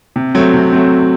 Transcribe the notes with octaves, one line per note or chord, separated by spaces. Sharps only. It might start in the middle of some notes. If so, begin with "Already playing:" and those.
C3
F#3 A3 C4
C3
F#3 A3 C4